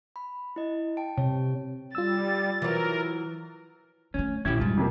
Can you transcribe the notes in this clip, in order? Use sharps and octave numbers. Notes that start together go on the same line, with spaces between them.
B5
E4 D#5
G5 A5 D7
C3 C#5
G3 F4 E6 A6
E3 F#3 A#4
D3 A3 C#4
A#1 C3 C#4 E4 G4 G#6
E2 G#2 G3 F4
F2 C3 A#3